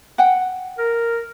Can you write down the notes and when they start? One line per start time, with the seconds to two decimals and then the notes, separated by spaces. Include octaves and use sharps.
0.18 F#5 G5
0.78 A#4